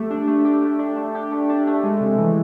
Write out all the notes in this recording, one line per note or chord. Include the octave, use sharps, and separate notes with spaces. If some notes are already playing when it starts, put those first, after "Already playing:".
Already playing: A3 G4
D4
A3
G4
A3
D4
A3
G4
A3
D4
A3
G#3
C3
E3